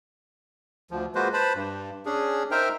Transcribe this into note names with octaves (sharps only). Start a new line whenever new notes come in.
D2 F3
G#3 A#3 F4 F#4 B4 C5
B4 C5 A5 B5
G2
C#4 D4 G#4
D#4 A#4 C5 E5 G5 F6